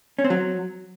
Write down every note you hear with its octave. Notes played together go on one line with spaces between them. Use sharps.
C#4
C4
F#3